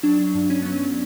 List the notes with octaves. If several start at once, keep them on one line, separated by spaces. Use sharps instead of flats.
F#3 D4
G2
C#4
F#3 B3
C#4